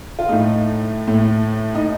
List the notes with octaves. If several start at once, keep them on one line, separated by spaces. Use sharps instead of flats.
F4
A2 A3 D#4
A2 A3
D#4